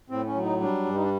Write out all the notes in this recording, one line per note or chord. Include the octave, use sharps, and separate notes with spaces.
A2 C4
C#4
F#3
D#4
G3 D4
G2
D#4
D4